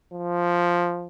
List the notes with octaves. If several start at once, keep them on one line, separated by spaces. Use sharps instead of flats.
F3